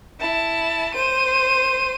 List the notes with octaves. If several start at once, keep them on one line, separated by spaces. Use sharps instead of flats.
E4 A5
C5 D#7